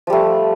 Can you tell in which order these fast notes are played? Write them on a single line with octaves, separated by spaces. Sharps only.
F3 G3 A3